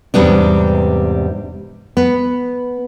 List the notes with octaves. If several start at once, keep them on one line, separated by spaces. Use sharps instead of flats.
E2 G#2 C3 G3 B3 D4
B3